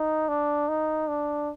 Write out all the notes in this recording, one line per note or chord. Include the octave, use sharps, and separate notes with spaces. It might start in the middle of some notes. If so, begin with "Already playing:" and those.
Already playing: D#4
D4
D#4
D4